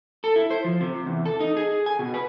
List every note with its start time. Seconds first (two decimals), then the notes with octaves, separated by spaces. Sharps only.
0.24 A4
0.36 E4
0.50 C5
0.64 F3
0.81 C3
1.06 E2
1.26 A4
1.40 D#4
1.57 G#4
1.86 G#5
1.99 B2
2.14 B4